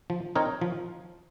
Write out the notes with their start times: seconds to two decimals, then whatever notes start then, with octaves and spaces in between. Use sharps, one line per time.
0.10 F3
0.35 C4 D#4 A#4 C#5
0.61 F3